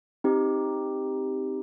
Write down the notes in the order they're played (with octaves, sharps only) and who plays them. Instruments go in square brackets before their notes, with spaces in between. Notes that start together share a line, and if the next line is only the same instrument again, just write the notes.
[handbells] C4 D#4 G4